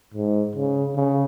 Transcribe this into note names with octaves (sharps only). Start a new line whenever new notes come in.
G#2
C#3
C#3